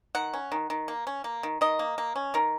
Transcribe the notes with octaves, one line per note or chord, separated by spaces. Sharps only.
D#3 F#5
C#4
D#3
D#3
A#3
C#4
A#3
D#3
D#3 D#5
A#3
A#3
C#4
D#3 A#4